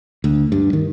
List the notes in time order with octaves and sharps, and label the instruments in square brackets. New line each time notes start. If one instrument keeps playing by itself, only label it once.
[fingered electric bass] D2
G2
D#3